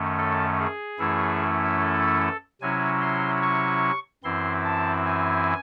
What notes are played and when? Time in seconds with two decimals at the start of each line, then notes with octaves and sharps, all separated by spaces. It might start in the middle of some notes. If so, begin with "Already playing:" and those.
Already playing: F#2 D#3 A3 C#4
0.18 A4
0.59 G#4
0.99 F#2 E3 A3 C#4 E4
1.80 A4
2.61 C3 F#3 C#4 E4 G#5
3.02 C6
3.42 C#6
4.24 F#2 E3 C4 E4 C6
4.64 A5
5.05 G#5